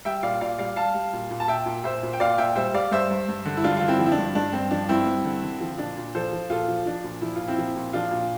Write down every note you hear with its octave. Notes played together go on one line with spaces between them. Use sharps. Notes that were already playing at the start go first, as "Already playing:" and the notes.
G3 E5 G5
A#2 D5 F5
A#2 D5 F5
G3 D5 F5
G3 F5 A5
G3
A#2
A#2
A5
A#2 E5 G5
A#2
A#2 C5 E5
A#2
G5
A#2 D5 F5
A#2 E5 G5
G3 C5 E5
G3 D5 F5
G2 C5 E5
G2
G2
D3
E4
G2 D4 F4
D3 F4
C4 E4
F3
E4
D4
G2
G2 D4
G2 C4
F3 D4
G2 C4 E4
G2
D3
D3
F3
A#2 D4
A#2
F3 A4 C5
F3
A#2 F4 A4
F3
F3 D4
A#2
F3 E4
A#2 F4
C4 E4
F3
A#2
F3 D4 F4
A#2